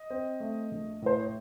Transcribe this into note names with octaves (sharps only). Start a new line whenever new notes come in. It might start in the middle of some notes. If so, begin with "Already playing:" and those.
Already playing: D#5
C4
A3
A#1
A2 C5
C#5